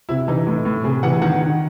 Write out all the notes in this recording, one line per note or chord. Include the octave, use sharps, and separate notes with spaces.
C3 E4
E3 D#4
A2
A2
C3 G#4
E3 F#5
D#3 F#5
D#3